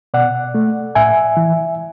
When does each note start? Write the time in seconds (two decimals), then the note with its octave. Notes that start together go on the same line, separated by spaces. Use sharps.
0.14 B2 D5 F#5
0.55 A3
0.95 A2 E5 G#5
1.37 E3